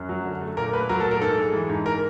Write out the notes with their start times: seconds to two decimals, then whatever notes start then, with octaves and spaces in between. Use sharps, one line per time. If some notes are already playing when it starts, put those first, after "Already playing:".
Already playing: F#2
0.09 F#3
0.25 D3
0.41 A3
0.57 A#2 A#4
0.73 A3 B4
0.89 F#3 A#4
1.00 A4
1.06 A#2
1.11 A#4
1.21 G#2 A4
1.38 G#3
1.53 E3
1.69 G#2
1.86 A#4